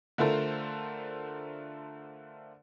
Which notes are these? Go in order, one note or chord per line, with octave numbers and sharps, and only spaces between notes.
D3 A3 F4 A4 A#4 C5